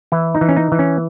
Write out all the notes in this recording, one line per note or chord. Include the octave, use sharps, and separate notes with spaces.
E3 E4
D#4
E3
C#4
D#4
E3
C#4